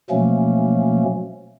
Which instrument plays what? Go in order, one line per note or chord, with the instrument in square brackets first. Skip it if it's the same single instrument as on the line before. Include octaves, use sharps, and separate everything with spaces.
[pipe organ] B2 F3 F#3 A3 A#3 C#4